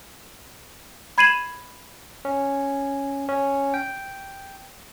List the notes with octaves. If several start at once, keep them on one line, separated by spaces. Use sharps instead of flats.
B5 G#6 C7 D#7 E7 F#7
C#4
C#4
G5